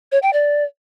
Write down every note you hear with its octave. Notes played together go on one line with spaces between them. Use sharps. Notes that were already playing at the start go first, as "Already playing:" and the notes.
C#5
G5
D5